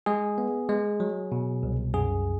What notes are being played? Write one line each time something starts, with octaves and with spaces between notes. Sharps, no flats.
G#3 G#4
B3
G#3
F#3
B2
C2
F#2 G#4